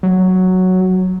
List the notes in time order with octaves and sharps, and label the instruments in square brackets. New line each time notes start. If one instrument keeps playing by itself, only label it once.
[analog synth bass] F#3